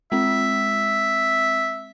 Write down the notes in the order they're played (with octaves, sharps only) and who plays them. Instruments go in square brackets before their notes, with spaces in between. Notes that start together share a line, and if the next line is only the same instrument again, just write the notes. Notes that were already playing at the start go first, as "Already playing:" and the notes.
[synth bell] G#3 C4 [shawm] E5